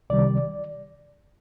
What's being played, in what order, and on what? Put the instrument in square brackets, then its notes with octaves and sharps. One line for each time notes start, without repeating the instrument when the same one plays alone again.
[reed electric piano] C2 C3 D#3 G3 D5